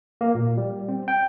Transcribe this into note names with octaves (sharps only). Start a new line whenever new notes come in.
A#3
A#2
G3
C4
G5